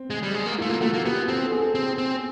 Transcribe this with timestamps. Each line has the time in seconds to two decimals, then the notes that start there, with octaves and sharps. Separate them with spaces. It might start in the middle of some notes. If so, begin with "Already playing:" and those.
Already playing: C4
0.10 G#3
0.23 G3
0.34 G#3
0.46 A#3
0.58 A3 F4
0.69 A#3
0.81 A3 F#4
0.93 A#3
1.05 B3 G4
1.28 C4 A4
1.40 A4
1.52 G#4
1.75 C4
1.98 C4